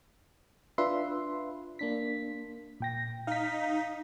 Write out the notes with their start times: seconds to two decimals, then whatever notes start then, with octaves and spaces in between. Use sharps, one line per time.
0.78 D4 F4 B4 E5 C6
1.79 A#3 D4 B6
2.80 A#2 G5 A#6
3.27 D#4 F5 B6